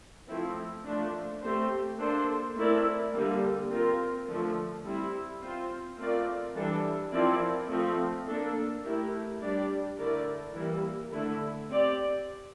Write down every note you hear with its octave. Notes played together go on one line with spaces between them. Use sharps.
F3 A3 C4 E4
F3 A3 D4
A3 C4 G4 C5
A#3 D4 A4 C5
A3 C4 E4 A#4 D5
D3 G3 A#3
C4 F4 A#4
D3 F3 A3
G3 C4 E4
C4 F4 C5
A3 C4 F4 A#4 D5
E3 G3 D4 A4
F3 C4 E4 A#4 D5
F3 A3 C4
A#3 D4 A4
A3 E4 G4 A#4
G3 D4 G4 D5
D3 A3 E4 A#4 D5
E3 G3 A#3 E4 A#4
D3 A3 E4
C4 G4 D5